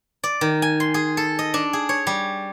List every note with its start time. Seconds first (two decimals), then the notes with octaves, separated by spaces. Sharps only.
0.23 D5
0.41 D#3
0.62 G#5
0.80 C6
0.94 G#4
1.17 A4
1.39 D#5
1.54 D4
1.73 G#4
1.89 C#5
2.07 G3